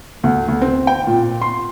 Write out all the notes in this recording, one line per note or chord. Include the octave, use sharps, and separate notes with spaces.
D2
D2
C4
G5
A#2
C6